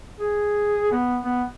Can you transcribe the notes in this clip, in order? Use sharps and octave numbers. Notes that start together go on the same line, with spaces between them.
G#4
B3
B3